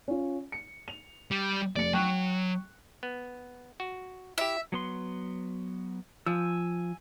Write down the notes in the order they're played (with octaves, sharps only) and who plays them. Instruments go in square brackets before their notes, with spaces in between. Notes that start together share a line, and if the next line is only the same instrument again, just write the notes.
[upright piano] C#4 F4
C#7
F7
[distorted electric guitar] G3
[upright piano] F1 C#7 [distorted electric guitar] D5
[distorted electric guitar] F#3 [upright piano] G5 C#6 F#6
[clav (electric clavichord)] B3
F#4
[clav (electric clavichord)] E4 G4 [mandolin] E5
[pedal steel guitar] F#3 B3 C6
[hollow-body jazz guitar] F3 [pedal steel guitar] G#5 E6